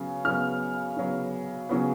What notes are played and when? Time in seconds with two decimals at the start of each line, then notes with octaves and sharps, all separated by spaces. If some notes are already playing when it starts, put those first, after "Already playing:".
Already playing: C#3 F#3 B3
0.24 C#3 F#3 B3 F6
0.97 C#3 F#3 B3
1.69 C#3 F#3 B3